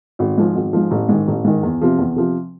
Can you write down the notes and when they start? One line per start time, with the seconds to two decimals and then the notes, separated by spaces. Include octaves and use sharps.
0.19 G#1
0.38 G#2 F3
0.55 G#1
0.73 G#2 F3
0.91 A1
1.09 G#2 D#3
1.28 A1
1.44 G#2 D#3
1.63 E2
1.81 C3 F3
1.98 E2
2.16 C3 F3